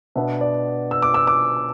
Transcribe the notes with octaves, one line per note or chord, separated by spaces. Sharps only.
B2 B3 D4 E5
D5
E6
D6
E6
D6